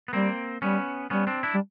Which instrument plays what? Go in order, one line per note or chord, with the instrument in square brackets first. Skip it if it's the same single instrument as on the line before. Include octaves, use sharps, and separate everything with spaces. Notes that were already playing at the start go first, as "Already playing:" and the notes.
[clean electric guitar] B3
[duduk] G3 [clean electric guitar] A#3 C4
[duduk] G3 [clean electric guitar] B3 C#4
[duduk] G3 [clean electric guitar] B3 C#4
[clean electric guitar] C4 D4
D4 E4
[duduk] G3